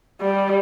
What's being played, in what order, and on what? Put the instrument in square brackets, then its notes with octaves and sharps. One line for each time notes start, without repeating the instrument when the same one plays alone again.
[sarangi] G3